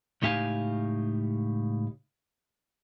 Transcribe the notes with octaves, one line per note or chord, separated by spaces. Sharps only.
C#2 A2 D#4 G4 F5 G#5